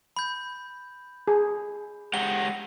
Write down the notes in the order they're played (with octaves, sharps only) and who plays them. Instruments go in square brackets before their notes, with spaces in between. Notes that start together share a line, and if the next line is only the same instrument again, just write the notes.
[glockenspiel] B5 G6
[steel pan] G#4
[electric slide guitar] G#3 G4 F#5 [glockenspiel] G7